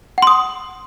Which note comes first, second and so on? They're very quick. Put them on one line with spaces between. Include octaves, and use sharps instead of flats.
F#5 C6 D#6